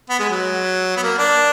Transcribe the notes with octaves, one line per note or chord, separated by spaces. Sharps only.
B3
G#3
F#3
B3
A#3
D4